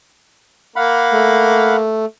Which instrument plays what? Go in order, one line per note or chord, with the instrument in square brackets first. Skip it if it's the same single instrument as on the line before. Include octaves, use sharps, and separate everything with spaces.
[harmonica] A#3 [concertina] F5 F#5 B5
[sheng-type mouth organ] A3